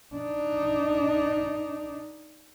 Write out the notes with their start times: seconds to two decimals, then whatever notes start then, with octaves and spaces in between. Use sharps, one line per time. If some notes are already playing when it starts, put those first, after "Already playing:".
0.15 D4 D#4